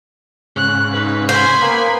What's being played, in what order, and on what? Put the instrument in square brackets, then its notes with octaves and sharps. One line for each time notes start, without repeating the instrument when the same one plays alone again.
[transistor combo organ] G#2 C#3 [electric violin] F#6
[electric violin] D#4 B4
[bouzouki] C5 [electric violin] G#5 B5
[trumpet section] A#3 B3 B4